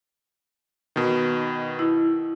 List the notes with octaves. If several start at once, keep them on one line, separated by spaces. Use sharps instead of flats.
B2 D#3
E4